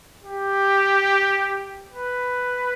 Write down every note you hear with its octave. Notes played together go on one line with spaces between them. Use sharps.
G4
B4